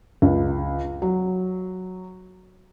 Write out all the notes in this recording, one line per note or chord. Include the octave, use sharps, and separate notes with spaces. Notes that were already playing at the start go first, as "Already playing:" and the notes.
C#2
F#3